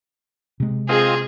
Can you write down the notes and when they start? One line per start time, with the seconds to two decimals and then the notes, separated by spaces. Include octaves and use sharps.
0.60 C3 G#3
0.89 C4 F4 G#4 D#5